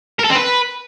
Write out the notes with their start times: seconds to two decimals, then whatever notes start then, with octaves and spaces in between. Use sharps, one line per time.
0.19 A#4
0.24 A4
0.30 C4
0.35 B4